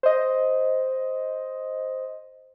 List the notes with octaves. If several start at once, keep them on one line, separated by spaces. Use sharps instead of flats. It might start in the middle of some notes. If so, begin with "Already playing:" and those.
C5 D#5